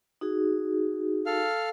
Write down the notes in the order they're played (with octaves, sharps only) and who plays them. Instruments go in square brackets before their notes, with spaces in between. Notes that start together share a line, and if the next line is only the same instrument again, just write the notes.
[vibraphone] D#4 F#4 G#4
[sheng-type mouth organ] A4 F5 F6